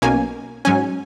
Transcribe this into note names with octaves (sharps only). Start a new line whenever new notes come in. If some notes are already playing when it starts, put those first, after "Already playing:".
B1 B2 A#3 C#4 G#5
G#2 F#3 C#4 G#5